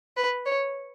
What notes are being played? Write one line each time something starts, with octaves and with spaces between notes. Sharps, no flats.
B4
C#5